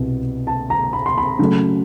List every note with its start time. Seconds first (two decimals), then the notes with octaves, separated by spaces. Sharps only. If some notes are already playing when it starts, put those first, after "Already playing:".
Already playing: C2 B2
0.47 A5
0.70 A#5
0.93 B5
1.06 C6
1.18 B5
1.39 C#3 F#3 A3